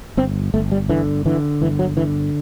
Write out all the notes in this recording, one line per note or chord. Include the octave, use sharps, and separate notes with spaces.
G1 C4
G1 A3
G3
D3 E3
D3 E3
G1 E3
F#3
D3 E3